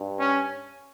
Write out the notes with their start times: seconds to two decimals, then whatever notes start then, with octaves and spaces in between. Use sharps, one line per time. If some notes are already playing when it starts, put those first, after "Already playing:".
Already playing: G2
0.19 C#4